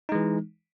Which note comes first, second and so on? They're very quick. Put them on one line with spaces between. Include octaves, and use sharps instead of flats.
D#4 G#3 E3